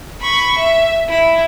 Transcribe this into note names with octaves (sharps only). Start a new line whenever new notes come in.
B5 C#6
E5
E4